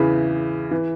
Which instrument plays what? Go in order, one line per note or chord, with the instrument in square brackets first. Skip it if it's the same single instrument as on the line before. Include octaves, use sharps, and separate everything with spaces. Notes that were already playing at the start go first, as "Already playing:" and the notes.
Already playing: [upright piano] E2 C#3 E3 B5
E3